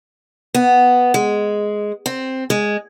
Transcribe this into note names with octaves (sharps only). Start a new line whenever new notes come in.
B3
G#3
C4
G#3